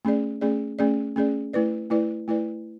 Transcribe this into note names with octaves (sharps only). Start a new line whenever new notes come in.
A3 C#4 G#4 D5
A3 C#4 G#4 D5
A3 C#4 G#4 D5
A3 C#4 G#4 D5
A3 E4 B4 D5
A3 E4 B4 D5
A3 E4 B4 D5